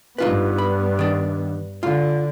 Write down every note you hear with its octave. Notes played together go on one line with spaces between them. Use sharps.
G2 B3 D#4 F4 B4
B5
D#3 D4
D3 F4